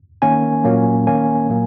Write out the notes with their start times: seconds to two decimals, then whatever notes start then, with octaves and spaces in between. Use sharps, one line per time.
0.22 D#3 A#3 C#4 G#5
0.64 A#2 F#3 A#3 C#4
1.07 D#3 A#3 C#4 G#5
1.50 A#2 F#3 A#3